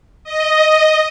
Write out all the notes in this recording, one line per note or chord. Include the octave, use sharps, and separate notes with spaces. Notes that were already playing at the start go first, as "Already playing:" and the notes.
D#5